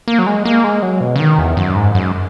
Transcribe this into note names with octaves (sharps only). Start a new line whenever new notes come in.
A#3
F#3
G#3
A#3
G#3
F#3
B2
C#3
D#3
E2
F#2
G#2
F#2